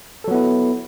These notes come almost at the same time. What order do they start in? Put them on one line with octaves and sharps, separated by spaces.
A4 F#3 B3 E4